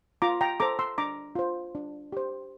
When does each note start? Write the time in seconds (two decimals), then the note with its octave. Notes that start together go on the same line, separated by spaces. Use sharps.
0.22 F4 A#5 D6
0.41 G5 A#5
0.60 A4 C5 A#5 D6
0.79 C6 E6
0.98 D4 A#5 D6
1.35 F4 C5
1.75 D4
2.12 G4 C5